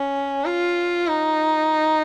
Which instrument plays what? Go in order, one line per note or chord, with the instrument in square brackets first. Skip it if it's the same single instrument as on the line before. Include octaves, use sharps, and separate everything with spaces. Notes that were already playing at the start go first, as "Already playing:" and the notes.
Already playing: [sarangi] C#4
F4
D#4